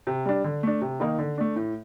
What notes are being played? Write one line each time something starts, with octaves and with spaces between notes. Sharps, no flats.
C3
G3 D4
D3
A3 D4
C3
D#3 A#3 D#4
D3
A3 D4
A2